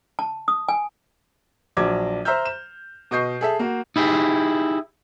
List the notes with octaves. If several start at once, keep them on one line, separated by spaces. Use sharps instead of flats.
A5
D#6
G#5
A#1 F#3 D4 D6 G#6
C5 E5 A#5 E6 F6 G6
E7
B2 D#5 C#6 G6 C7
G#4 A4 E5
A#3 F#4
D#4 E4 G4 G#4